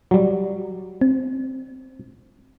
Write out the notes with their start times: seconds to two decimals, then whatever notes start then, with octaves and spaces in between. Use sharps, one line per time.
0.11 F#3 G3
1.01 C4